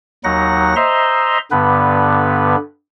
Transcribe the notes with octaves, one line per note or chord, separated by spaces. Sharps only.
D#2 F#3 D#4 F#5 A#6
C5 D#5 E5 A#5 C6
G2 D3 B3 B4